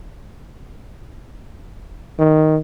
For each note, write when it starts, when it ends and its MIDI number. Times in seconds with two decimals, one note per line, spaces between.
2.19 2.57 51